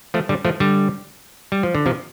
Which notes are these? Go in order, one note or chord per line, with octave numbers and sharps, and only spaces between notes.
F3 A3
D3 G3
F3 A3
D3 G3
G3
F3
D3
C3 F3